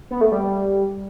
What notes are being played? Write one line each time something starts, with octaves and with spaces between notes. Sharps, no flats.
B3
A3
G3